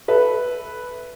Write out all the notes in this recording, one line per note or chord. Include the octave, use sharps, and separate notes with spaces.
A4 B4 E5